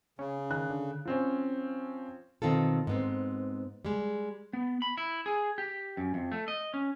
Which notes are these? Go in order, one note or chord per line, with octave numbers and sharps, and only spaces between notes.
C#3 C#4
D#3 F#6
D3
F3 C4 C#4
B2 D#3 C4 F4 A4
G#2 B3 C4
G3 G#3
B3
B5
E4
G#4
G4
F#2
F2
A3
D#5
C#4